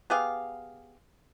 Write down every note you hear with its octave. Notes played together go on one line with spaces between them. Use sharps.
B3 G4 G#4 F5